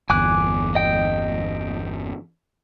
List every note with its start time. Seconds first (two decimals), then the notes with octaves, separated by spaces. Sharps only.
0.10 G1 E2 G#5 D6 F#6
0.75 D#5 G5